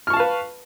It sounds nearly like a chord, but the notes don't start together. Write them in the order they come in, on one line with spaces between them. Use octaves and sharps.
F6 C#6 A5 F5 B4